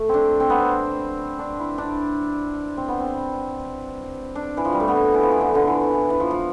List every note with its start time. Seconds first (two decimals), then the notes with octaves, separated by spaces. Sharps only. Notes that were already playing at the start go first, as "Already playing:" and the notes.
Already playing: A3
0.09 C4 D4
0.40 C4
0.50 B3
0.60 C4
1.39 D4
1.59 E4
1.78 D4
2.77 C4
2.88 B3
3.00 C4
4.35 D4
4.57 E3
4.65 F3
4.73 G3
4.80 A3
4.88 B3
5.14 E3
5.23 F3
5.31 E3
5.41 D3
5.55 D3
5.67 E3
5.93 E3
6.10 E3
6.20 F3
6.31 F3